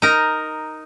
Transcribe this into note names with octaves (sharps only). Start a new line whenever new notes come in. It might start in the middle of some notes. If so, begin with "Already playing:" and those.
D#4 A#4